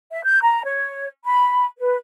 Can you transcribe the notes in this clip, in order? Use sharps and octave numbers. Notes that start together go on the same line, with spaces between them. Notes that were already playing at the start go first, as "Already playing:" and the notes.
E5
G6
A#5
C#5
B5
B4